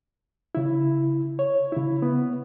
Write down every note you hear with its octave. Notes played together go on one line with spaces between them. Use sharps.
C#3 E4
C#5
C#3 E4
B3